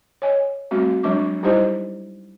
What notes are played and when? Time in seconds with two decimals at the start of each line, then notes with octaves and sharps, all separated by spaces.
0.22 C#5 D#5 G#5
0.71 G3 A3 C4 F#4
1.03 F#3 G#3 D4 C#6 D6
1.43 G3 D#4 E4 G4 C5 D#5